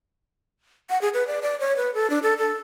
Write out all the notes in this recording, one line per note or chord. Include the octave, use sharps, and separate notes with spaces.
F#5
G#4
B4
D5
D5
C#5
B4
A4
D4
A4
A4